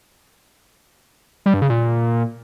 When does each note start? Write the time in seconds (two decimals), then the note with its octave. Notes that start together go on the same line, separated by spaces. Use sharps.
1.46 G3
1.54 G2
1.62 C#3
1.70 A#2